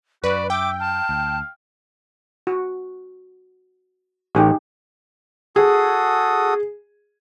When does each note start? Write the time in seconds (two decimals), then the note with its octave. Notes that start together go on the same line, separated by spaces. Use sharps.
0.24 F#2 F#4 B4 D5
0.50 E5 G5 D6
0.80 F5 A5
1.09 D2
2.47 F#4
4.35 A1 D#4 G4 G#4
5.56 F#4 G#4 A4 D#6